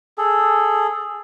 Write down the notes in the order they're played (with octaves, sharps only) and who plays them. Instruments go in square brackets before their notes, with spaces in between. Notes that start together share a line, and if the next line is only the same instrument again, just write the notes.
[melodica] G#4 A4